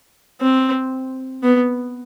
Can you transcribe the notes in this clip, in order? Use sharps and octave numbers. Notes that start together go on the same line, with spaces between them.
C4
B3